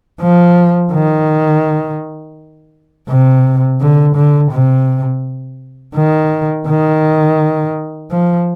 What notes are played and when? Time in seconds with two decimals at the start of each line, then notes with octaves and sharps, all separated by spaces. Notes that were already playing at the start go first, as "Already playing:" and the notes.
0.21 F3
0.92 D#3
3.09 C3
3.81 D3
4.16 D3
4.52 C3
5.95 D#3
6.67 D#3
8.11 F3